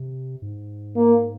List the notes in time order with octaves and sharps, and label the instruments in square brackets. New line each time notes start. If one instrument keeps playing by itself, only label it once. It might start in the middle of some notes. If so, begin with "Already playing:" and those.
Already playing: [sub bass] C3
G#2
[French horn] A#3